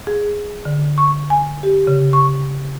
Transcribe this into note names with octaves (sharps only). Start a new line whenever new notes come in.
G#4
D3
C#6
G#5
G4
C#3
C#6